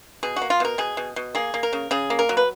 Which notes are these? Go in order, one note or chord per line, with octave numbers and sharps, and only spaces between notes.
B2 G#4
F#4
A#3
F4
B2 A#4
B2 G#4
B2
B2
A#3 G#4
A#3
A#4
C#3
C#3 G#4
A#3
A#4
F#3
B4